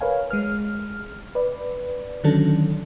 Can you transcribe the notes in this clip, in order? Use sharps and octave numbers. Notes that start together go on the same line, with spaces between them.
A#4 B4 C#5 F5 G#5
G#3 F6
B4 D5
D3 D#3 F#3 C#4 D4 A4